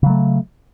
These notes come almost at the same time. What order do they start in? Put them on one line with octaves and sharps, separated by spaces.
C#3 F#3 A3